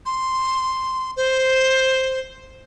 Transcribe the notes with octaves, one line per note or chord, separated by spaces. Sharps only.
C6
C5